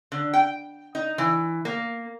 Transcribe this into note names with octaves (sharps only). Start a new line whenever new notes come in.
D3
G5
D#4
E3
A#3